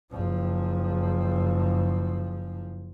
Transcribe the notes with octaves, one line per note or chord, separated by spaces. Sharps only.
F#1 F3